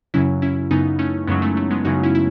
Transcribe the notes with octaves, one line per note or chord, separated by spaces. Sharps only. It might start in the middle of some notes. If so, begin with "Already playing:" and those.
F#2 C#3 F#3 C#4 E4
C#4 E4
F#2 C#3 F#3 B3 D#4
A3 C#4
F#2 C#3 F#3 G#3 B3
A3
A3
G#3 B3
F#2 C#3 F#3 D#4 F#4
C#4 E4
E4